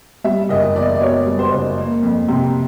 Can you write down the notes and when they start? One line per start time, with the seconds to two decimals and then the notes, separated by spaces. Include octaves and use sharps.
0.24 G3 E5
0.49 F#1 D#5
0.76 E2 D5
0.95 D5
1.01 B2 C#5
1.26 G3
1.39 C5
1.52 F#1
1.78 A#3
2.03 F2
2.28 C3